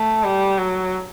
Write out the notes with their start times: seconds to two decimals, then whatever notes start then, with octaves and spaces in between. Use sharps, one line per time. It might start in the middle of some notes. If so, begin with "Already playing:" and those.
Already playing: A3
0.24 G3
0.58 F#3